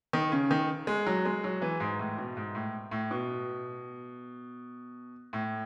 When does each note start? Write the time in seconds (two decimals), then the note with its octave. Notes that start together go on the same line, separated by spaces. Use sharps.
0.13 D#3
0.32 C#3
0.51 D#3
0.87 G#3
1.07 F#3
1.25 G#3
1.44 F#3
1.62 E3
1.80 G#2
1.99 A2
2.18 B2
2.37 G#2
2.55 A2
2.91 A2
3.11 B2
5.33 A2